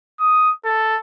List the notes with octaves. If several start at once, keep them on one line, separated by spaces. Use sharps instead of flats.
D#6
A4